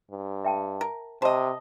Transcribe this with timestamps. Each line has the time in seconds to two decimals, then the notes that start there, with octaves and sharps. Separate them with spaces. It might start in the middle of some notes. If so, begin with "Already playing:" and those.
0.11 G2
0.44 E5 G5 A5
0.81 A#4
1.22 C3 C5 D#5 A5 A#5